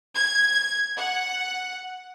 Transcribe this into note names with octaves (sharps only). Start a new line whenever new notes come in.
G#6
F#5